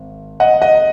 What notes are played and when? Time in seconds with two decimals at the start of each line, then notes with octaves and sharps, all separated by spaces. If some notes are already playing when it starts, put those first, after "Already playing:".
Already playing: G#1
0.40 D#5 F#5
0.61 D#5 F#5